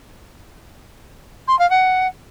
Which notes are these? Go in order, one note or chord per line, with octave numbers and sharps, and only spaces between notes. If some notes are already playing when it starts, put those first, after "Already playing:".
C6
F5
F#5